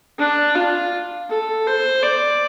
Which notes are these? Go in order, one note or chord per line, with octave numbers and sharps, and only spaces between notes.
D4
F4
A4
C5
D5